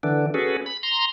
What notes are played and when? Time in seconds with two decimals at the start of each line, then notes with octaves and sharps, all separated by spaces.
0.03 D3 E3 D4
0.34 C#4 F#4 G#4 A4 B4
0.66 B5
0.83 A#5 C6